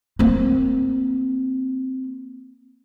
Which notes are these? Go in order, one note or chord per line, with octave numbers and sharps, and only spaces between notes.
A#3 C4